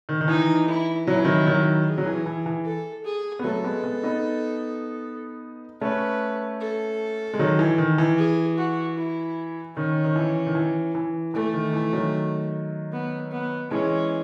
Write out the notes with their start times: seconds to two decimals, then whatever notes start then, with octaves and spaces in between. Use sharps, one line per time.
0.09 D#3
0.21 D#3
0.28 E3 D#4
0.68 E4
1.07 F#3 E4
1.16 E3
1.25 D#3 F#3
1.47 D#3 F#3
1.87 G#4
1.98 F#3
2.06 E3
2.26 E3
2.46 E3
2.65 A4
3.05 G#4
3.39 B3
3.44 F#3 A3 A4
3.64 G#3 B3
3.84 G#3 B3
4.03 B3 D#4
5.81 A3 C#4 B4
6.60 A4
7.33 G#3
7.39 D#3 F#3
7.59 E3
7.78 D#3
7.98 E3
8.18 G#4
8.58 F#4
8.98 E4
9.76 D#3 C#4
10.04 D#3
10.16 E3
10.46 D#3
10.55 E3
10.95 E3
11.34 E3 A3
11.54 D#3
11.73 E3
11.93 D#3 F#3
12.92 B3
13.32 B3
13.71 E3 G#3 C#4